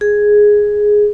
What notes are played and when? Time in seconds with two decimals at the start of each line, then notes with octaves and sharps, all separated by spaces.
0.01 G#4